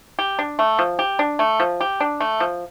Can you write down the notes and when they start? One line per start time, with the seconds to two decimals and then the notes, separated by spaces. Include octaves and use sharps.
0.19 G4
0.39 D4
0.59 A3
0.79 F3
0.99 G4
1.19 D4
1.39 A3
1.60 F3
1.80 G4
2.00 D4
2.20 A3
2.40 F3